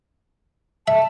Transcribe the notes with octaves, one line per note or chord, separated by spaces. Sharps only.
E5 A5